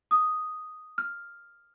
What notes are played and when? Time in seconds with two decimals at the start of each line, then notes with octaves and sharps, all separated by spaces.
0.11 D#6
0.98 F6